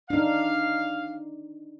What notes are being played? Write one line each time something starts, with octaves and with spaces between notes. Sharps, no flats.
D4 D#4 F5